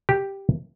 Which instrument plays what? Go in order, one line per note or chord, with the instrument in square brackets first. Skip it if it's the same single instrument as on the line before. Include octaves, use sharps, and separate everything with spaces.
[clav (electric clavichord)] G4